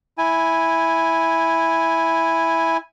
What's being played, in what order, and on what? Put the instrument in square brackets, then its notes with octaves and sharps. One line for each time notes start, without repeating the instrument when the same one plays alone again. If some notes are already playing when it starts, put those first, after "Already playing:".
[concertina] E4 G#5